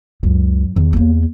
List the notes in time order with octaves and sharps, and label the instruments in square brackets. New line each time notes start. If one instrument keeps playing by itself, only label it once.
[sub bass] C#2 [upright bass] F#2
[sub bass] E2 [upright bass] D#3
[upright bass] A3 A#3